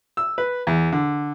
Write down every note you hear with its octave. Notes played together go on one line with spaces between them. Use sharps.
E6
B4
E2
D3